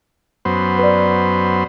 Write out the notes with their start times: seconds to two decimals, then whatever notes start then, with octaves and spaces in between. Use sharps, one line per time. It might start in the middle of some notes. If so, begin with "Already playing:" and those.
0.45 F#2 B3 C5
0.79 B4 D5